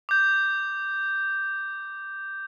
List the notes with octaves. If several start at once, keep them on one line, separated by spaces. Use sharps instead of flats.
D6 G6